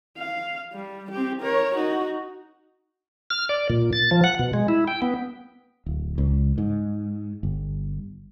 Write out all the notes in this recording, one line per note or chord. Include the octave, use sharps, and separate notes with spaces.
F5
G3
C4 G4
A#4 C#5
D#4 F#4
F6
D5
A#2
A6
F3
F#5
B2
G#3
E4
G5
B3
D1
C#2
G#2
G1